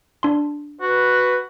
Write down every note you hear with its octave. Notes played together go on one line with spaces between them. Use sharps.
D4 C6
F#4 B4